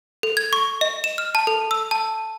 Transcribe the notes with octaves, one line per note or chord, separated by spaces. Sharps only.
A4
G#6
C#6
D#5
E7
F6
A5
A4
E6
A5